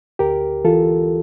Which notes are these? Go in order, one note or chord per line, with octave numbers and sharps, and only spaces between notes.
D2 G4 A#4
E3 F4 A4